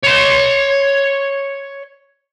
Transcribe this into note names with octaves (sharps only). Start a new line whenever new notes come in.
C#5 C6